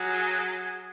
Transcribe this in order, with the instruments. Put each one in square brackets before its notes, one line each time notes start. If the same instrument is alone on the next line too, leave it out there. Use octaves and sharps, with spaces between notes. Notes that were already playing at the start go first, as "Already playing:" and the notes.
Already playing: [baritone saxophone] F#3 [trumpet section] G#4